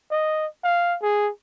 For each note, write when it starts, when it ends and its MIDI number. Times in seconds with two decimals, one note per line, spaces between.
0.11 0.47 75
0.64 0.97 77
1.02 1.30 68